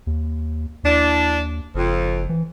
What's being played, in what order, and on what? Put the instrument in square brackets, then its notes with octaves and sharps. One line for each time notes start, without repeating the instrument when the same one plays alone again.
[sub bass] D#2
[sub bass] D#2 [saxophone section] E3 D4
[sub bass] F#1 [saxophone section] F2
[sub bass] E3